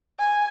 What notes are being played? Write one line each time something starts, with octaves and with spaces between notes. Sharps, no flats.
G#5